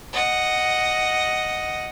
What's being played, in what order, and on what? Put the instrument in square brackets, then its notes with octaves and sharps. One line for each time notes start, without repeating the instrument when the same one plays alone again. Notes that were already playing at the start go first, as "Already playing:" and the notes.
[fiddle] D#5 F#5